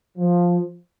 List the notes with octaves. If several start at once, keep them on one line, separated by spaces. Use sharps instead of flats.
F3